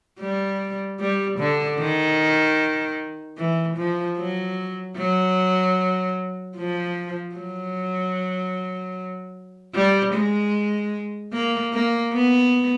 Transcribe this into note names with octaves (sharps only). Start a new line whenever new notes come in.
G3
G3
D3
D#3
E3
F3
F#3
F#3
F3
F#3
G3
G#3
A#3
A#3
B3